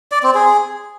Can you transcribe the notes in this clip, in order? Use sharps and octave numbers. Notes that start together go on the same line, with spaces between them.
D5
C4
G#4